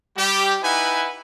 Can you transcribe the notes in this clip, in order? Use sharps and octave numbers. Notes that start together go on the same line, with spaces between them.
G3 G4
D#4 E4 B4 F#5 G#5